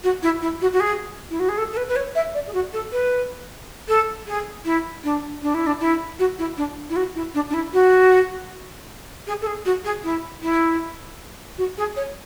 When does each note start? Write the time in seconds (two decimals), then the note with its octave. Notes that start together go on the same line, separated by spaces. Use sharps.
0.03 F#4
0.22 E4
0.41 E4
0.61 F#4
0.73 F#4
0.80 G#4
1.30 E4
1.39 F#4
1.48 G#4
1.57 A4
1.72 A4
1.77 B4
1.88 B4
1.96 C#5
2.15 E5
2.34 D5
2.47 G#4
2.53 F#4
2.73 A4
2.92 B4
3.88 A4
4.27 G#4
4.65 E4
5.04 D4
5.42 D4
5.54 E4
5.66 D4
5.80 E4
6.19 F#4
6.38 E4
6.57 D4
6.89 E4
6.96 F#4
7.15 E4
7.34 D4
7.49 D4
7.53 E4
7.73 F#4
9.27 G#4
9.41 A4
9.46 G#4
9.65 F#4
9.84 G#4
10.03 E4
10.42 E4
11.58 F#4
11.77 G#4
11.96 C#5